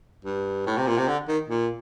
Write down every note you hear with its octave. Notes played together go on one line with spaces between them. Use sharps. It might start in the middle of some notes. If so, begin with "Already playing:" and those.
G2
A2
C3
A#2
C3
D3
D#3
A#2